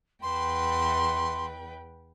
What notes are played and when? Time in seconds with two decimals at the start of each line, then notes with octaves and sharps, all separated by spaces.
0.22 E2 B4 G5 C6